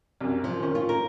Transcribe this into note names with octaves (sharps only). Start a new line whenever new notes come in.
C2 F#2
F3
D#3 C#4
F4
A#4